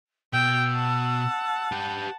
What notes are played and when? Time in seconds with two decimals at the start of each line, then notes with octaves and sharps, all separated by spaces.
0.33 B2 G5 E6
0.71 F#5 A5
1.72 G4 B4 G6